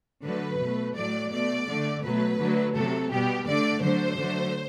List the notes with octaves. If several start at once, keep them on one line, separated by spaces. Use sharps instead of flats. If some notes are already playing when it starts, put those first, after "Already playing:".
D3 F#3 A3 B4
B2 A3
A2 F#3 A3 D5
B2 A3 D5
D3 A3
B2 F#3 A3 B4
D3 F#3 A3
C3 F#3 A3 A4
B2 G3 B3 G4
D3 A3 D5
D3 F#3 A3 C5
D3 F#3 A3